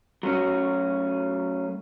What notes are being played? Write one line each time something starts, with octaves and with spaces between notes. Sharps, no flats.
F#3 A3 C#4 F#4